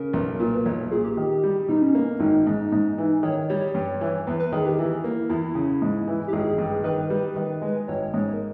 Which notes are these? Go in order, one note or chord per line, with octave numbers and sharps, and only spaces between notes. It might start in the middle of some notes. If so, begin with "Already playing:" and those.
Already playing: C#3 A#4
B1
A#2
B4
B1 C#5
A#2 G#4
G4
D#3
G3
B2 D#4
C#4
A#3 B3
G#1 D#4
G#2
G#2
E3
D#3 C#5
G3 C#5
G2
E3
E2 B4
B4
D#3 G#4
G4
E3 E4
A#3
E2 E4
C#3
G#2
E3
G4
G#1 G#4
G2
D#3 B4
G3
D#3
G#3
G#1 C#5
G#2
A#4